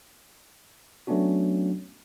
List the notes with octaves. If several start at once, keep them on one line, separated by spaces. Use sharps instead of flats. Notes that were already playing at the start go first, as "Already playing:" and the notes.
F#3 A3 B3 C#4 D4 F#4